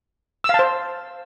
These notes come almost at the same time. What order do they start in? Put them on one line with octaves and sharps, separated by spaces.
E6 F5 A5 C5